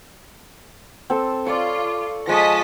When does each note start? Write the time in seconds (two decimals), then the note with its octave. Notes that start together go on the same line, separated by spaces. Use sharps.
1.10 C4 A4
1.47 F4 C#5 D5
2.27 F3 G#3 D#5 A5 C#6 B6